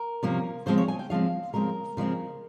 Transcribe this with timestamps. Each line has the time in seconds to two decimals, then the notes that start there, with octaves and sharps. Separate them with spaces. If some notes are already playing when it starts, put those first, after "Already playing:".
Already playing: A#4
0.23 C3 F3 A#3 C#4
0.66 C#3 F3 G#3 C4 C5
0.78 C#5
0.88 G#5
0.99 G5
1.10 C#3 F3 G#3 C4 F5
1.53 C#3 F3 G#3 C4 A#4
1.97 C#3 F3 G#3 C4